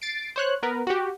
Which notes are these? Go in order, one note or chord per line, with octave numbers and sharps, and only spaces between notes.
A6 C7 D7
C5 C#5 F#6
B3 A#4 B4
F#4 G4